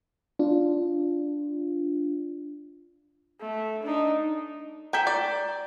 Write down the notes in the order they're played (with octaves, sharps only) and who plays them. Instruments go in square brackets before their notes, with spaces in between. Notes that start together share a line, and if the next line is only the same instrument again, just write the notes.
[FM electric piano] D4 F4
[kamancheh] A3
D4 D#4
[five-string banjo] A4 G5 G#5 [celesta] A#5 G6 B6
[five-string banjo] D5